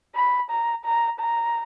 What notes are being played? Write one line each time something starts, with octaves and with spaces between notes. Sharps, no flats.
B5
A#5
A#5
A#5